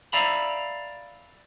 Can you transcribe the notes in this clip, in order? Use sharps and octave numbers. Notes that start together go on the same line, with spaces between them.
D5 E5 F5 A#5 B5